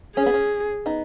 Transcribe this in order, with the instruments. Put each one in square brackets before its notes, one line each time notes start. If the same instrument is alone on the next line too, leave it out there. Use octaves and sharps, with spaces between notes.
[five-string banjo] C#4 [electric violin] G#4
[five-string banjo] B3
C#4
B3 D#4